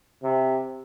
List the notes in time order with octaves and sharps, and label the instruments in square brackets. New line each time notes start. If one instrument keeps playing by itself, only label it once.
[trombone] C3